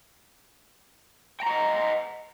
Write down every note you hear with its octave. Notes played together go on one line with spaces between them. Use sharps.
D#5 F#5 G5 A#5